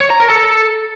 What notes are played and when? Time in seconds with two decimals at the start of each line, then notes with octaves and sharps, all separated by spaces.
0.01 C#5
0.10 A#5
0.20 A#4
0.30 A4